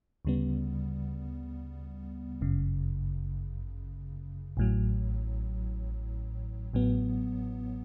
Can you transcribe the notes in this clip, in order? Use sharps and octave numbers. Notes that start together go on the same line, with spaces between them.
D2 C#3 G3 B3
G1 F#2 C#3
A1 A2 F#3
A1 A2 F#3 B3